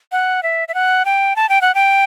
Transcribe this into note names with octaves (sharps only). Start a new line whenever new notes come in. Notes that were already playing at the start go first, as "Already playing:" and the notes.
F#5
E5
E5
F#5
G5
A5
G5
F#5
G5